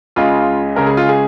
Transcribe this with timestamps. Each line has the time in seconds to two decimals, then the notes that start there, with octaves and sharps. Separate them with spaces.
0.16 C#2 C#3 G#3 F4
0.76 C#2 C#3 G#3 A#4
0.86 G#4
0.97 F4
1.09 G#4